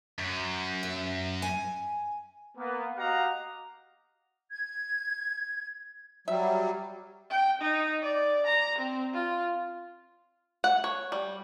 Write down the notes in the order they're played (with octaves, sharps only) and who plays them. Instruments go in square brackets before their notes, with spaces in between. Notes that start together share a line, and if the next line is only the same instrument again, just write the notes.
[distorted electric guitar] F#2
[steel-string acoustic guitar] E5
G#5
[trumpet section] A#3 B3
F#4 G4 D#5 F5 F#5 A#5
[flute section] G#6
[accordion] F#3 G3 [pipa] E5
[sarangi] G5
D#4
D5
A#5
C4
F4
[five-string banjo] F#5
C#5
G3